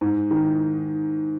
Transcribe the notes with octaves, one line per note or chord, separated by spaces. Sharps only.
G#2
D#3